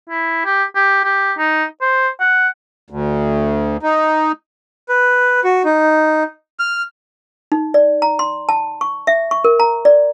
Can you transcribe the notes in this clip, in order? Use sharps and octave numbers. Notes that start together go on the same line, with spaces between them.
E4
G4
G4
G4
D#4
C5
F#5
D2
D#4
B4
F#4
D#4
F6
D#4
D5
A#5
C6
A5
C#6
E5
C#6
A#4
A#5
D5